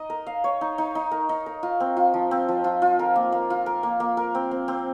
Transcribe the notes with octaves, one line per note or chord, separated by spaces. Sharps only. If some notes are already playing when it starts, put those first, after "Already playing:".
Already playing: D#4 D#5
A#4
F5
C#5
D#4
D#4
D#4
A#4
D#4
A#4
F4
C4
F4
F3
C4
F3
F4
F4
A#4
A#3
A#3
F4
A#4
A#3
A#3
A#4
C4
C4
C4